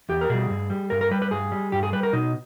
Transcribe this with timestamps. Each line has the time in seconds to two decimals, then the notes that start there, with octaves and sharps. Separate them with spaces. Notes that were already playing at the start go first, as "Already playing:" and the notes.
0.09 E2 G4
0.21 A#4
0.29 B2 G3 G#4
0.50 G2
0.70 G3
0.90 G2 A#4
1.01 A#4
1.11 G3 B4
1.22 B4
1.31 G2 G#4
1.52 G3
1.72 G2 G4
1.83 G#4
1.93 G3 B4
2.03 A#4
2.13 B2 D#4